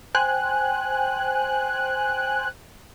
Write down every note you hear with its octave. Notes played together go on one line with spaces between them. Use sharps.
C5 G5 G#5 F#6